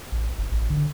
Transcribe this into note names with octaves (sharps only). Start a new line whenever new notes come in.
A1
G1
A1
D3